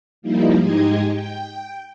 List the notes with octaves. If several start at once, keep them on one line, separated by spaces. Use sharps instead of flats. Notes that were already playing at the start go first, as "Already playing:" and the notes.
F3 G3 A#3 D#4 E4
G#2 G#3 D#4 G4 D#5 G#6
G5